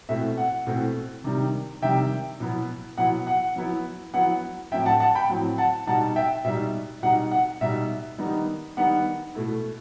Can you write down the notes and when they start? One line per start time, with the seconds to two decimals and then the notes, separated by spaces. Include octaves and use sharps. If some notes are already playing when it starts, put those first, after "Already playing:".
0.09 B2 A3 C4 E4 E5
0.37 F#5
0.67 B2 A3 C4 E4
1.24 C3 D#3 G3
1.82 C3 D#3 G3 E5 G5
2.40 B2 F#3 B3 E4
2.98 B2 F#3 B3 E4 F#5
3.27 F#5
3.56 F#3 B3 E4
4.14 F#3 B3 E4 F#5
4.72 A2 F#3 C4 E4 E5 G5
4.86 F#5 A5
5.00 F#5 A5
5.15 G5 B5
5.29 A2 F#3 C4 E4
5.58 F#5 A5
5.87 B2 G3 D#4 F#5 A5
6.16 E5 G5
6.45 B2 G3 D#4 E5
7.03 B2 G3 D#4 F#5
7.31 F#5
7.61 B2 G3 D#4 E5
8.18 D#3 G3 B3 D#4
8.77 D#3 G3 B3 D#4 F#5
9.35 B2 A3 E4